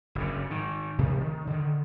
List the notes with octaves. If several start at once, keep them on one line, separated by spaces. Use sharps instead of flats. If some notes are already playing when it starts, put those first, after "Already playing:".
F#1 G2 C#3
G#2 D#3
C3 D#3 F3 A3
D#3
D3 D#3